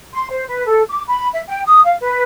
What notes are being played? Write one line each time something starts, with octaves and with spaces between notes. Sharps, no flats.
C6
C5
B4
A4
D6
B5
E5
G5
D#6
F5
B4